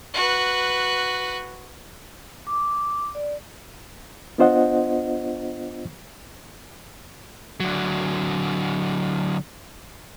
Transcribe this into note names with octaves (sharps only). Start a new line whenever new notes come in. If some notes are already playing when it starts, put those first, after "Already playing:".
F#4 B4
D6
D5
B3 D4 F4 C5 D#5 F#5
D3 F#3